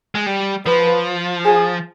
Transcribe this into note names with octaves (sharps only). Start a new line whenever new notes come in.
G#3
G3
F3 B4
G#4